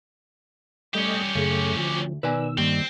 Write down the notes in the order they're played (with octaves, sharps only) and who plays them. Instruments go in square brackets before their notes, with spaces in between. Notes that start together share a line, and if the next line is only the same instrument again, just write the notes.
[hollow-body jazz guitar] G3 [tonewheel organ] A3 D#5 [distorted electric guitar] C#4 G4
[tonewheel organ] F#2 A3 [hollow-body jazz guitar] C#3 G#4
[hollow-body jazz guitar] D2 [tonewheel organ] F3
[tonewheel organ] B2 D#3 E6 [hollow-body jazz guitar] B4 D5 G#5
[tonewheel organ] G2 [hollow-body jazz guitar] D#3 G3 A#3 [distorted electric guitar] C4